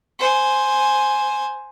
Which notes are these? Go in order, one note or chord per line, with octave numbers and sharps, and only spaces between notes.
C5 G#5